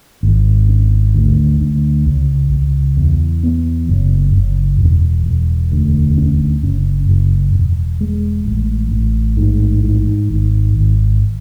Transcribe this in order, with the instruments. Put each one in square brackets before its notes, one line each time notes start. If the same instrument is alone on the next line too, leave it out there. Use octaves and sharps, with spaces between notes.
[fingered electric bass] G#1
C#4
D2
D2
C#2
C#2
E2
B3
F#1
F#1
E1
E1
D2
C#4
F#1
F#1
E1
G#3
A1
A1
G#2
G#2
G#1
G#1